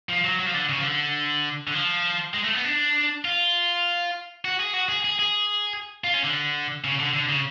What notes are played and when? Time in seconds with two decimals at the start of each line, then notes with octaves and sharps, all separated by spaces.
0.09 F3
0.25 F#3
0.39 F#3
0.46 F3
0.54 D3
0.69 C#3
0.78 F3
0.84 D3
1.68 D3
1.75 F3
2.34 G#3
2.44 A3
2.54 B3
2.64 D4
3.25 F4
4.45 F#4
4.60 G#4
4.74 F#4
4.89 G#4
5.04 G#4
5.19 G#4
6.04 F4
6.14 C#4
6.24 D3
6.84 C#3
6.99 D3
7.14 D3
7.29 C#3